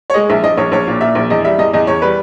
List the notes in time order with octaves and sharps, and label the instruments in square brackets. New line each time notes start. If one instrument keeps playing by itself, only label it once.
[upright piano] C#5
G#3 D#5
A#1 E5
A#1 D#5
A#1 C#5
A#1 C#5
A#2
A#2 E5
A#1
E2 D#5
G3 E5
E2 D#5
E2 D#5
E2 C#5
G3 B4